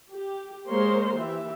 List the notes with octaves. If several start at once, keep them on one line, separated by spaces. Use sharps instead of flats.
G4
G#3 A#3 A#4 C5 C#5 C6
E3 G4 E5